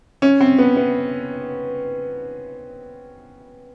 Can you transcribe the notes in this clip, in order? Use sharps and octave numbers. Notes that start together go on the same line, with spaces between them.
C#4
C4
B3
B3